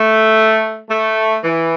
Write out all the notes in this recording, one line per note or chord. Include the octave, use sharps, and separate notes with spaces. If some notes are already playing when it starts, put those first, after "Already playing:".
Already playing: A3
A3
E3